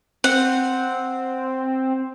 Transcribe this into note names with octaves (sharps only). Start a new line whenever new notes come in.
C4 F#5